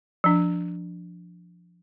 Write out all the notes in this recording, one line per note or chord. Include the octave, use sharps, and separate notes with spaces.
F3 D4